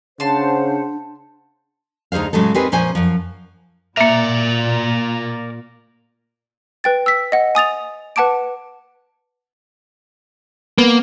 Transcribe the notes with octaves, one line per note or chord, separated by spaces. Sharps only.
C#3 D4 C5 F#5 A5 C6
D2 D#4 G#4 C5 F5
A2 C#3 F#3 G#3 A4
C4 D#4 G4 G#4 A#4 B4
A#2 F3 C#4 C5 G#5
F#2 F3
A#2 A#3 A#4 D5 E5
B4 G5 A6
E6 B6
D#5 F#5
G#5 D#6 A6 F7
B4 F#5 A5 D6 D7
A#3 B3